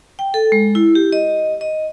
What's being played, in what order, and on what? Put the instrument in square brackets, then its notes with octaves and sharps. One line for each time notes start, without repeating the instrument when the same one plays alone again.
[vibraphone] G5
A4
G#3
E4
G4
D#5
D#5